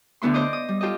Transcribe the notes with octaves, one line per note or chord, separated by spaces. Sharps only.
D2 D3 B3 E4 C6
C5 D5 D#5 D6 D#6
D#6
G3
F4 G4 A4 D#5